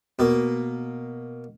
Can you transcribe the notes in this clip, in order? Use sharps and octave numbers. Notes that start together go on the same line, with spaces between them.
B2 A#3